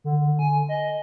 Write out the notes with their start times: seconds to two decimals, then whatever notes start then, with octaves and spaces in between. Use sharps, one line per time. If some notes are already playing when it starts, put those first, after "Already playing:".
0.04 D3
0.39 G#5
0.69 D#5